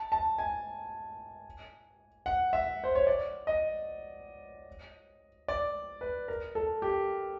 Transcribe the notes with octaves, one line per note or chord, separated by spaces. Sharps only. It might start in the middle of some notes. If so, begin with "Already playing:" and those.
Already playing: A5
A5
G#5
F#5
E5
C5
C#5
D5
D#5
D5
B4
A#4
A4
G4